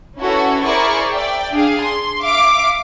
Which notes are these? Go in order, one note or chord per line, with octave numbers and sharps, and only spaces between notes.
C#4 E4 F#4 A4 B4 C#5
E4 G#4 A#4 C5 D5 C#6
D5 E5 G5
D4 G#4 F5
C6
E5 F5 D6